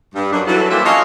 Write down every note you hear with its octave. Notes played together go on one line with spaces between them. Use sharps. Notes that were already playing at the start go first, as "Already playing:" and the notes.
G2
F#2 D4
E3 F#3 A4
E3 G3 A#3 G4 C5 E5
C#4 D4 F4 F#4 C#5 D#5